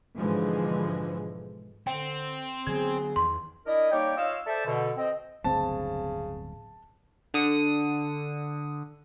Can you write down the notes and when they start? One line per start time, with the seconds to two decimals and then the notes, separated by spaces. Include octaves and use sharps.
0.16 G#2 B2 D3 E3 F3 G#3
1.87 D3 C4 G5
2.67 D3 F#3 B3 G#4 G#6
3.16 E2 D#3 C6
3.66 D4 E4 A#4 D#5
3.92 G3 A#3 D#4 C#5 G5 D6
4.17 F4 C#5 D#5 F5 E6
4.47 A4 C5 D5 E5 A5
4.66 B2 D3
4.97 C4 D#5
5.44 D1 G1 C#3 C4 A5
7.34 D3 D#6 C#7